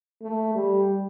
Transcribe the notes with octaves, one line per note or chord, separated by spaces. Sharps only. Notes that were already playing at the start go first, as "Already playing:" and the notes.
A3
G3